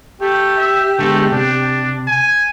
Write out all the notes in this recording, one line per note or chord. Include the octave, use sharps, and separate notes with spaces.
A3 G4
E5
D3 G#3 A3 B3
C3 D4
G#5